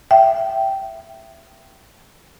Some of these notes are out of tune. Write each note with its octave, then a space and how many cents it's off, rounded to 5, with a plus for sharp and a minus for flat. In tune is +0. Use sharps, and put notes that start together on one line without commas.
E5 +15 G5 -10